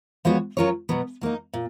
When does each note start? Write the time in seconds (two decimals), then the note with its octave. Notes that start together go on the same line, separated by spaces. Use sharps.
0.25 F3 G#3 B3 F#4 C#5
0.57 F#3 C#4 F4 A#4 C#5
0.89 B2 F#3 B3
1.21 F#3 A#3 D#4
1.54 A#2